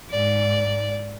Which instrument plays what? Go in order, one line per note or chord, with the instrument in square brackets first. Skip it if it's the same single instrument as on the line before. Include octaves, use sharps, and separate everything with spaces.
[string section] G#2 [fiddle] D5